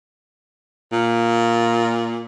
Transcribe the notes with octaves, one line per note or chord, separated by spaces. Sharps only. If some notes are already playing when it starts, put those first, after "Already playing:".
A#2